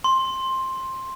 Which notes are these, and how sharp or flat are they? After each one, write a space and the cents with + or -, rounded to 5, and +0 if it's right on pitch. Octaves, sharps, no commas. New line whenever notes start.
C6 +10